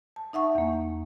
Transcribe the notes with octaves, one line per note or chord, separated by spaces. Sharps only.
A5
D#4 E5 F#5 C#6
E2 A#3